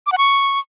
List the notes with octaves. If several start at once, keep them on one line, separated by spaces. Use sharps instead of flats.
D6
F#5
C#6